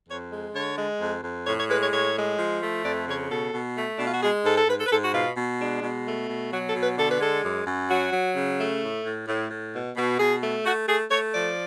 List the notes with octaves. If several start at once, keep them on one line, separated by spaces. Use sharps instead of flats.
F2 C#5
G#3
D3 C#5
G#3
F2
F2
A2 C#5
C#5
G#3 B4
C#5
A2 C#5
G#3
F3
A3
F2 D5
C#3 C#5
B2 A4
B2
A3
B2 D4
F4
F#4
G#3 G#4
G#2 A4
A4
G#2 B4
A4
B4
G#2 A4
F#4
B2 F4
B2
G#3 D4
B2
A3
B2
F#3 F#4
A4
B2
B4
D3 A4
B4
G#3 A4
F#2
F#2
F#3 F#4
F#3
C#3
A3
A2
A2
A2
A2
B2
B2
B2 G#4
A3
A3 F#4
A3 G#4
A3 C#5
F3 D5